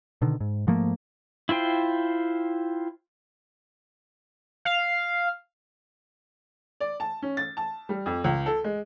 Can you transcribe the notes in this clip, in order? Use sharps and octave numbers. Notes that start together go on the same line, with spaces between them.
B2 D3 D#3
G#2
G#2 F3 A3 A#3
E4 F4 C5 G5
F5
D5
A5
C#4
A6
A5
G3
F2
C#2
A4
G#3